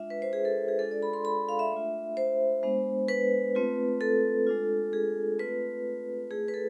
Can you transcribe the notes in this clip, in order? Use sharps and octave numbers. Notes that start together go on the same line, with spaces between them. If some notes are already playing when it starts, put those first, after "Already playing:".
Already playing: G#3 D4 F4 E5
B4
C5
G#4
A4
G#4
G#3 D4 F4 A4
D5
B5
C6
B5
F5
E5
A3 D4 F4
C5
G#3 B3 D4
B4
A3 C4 F4
A4
G#3 D4 F4
G#4
A3 C4 F4 B4
A3 E4 G#4
B4
A4